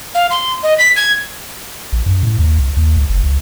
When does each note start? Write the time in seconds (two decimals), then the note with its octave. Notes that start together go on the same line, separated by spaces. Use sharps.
0.15 F5
0.31 C6
0.63 D#5
0.78 B6
0.96 G#6
1.92 A#1
2.06 F#2
2.23 A2
2.38 D#2
2.59 C2
2.77 D#2
2.97 C#2
3.09 F#1
3.24 C#2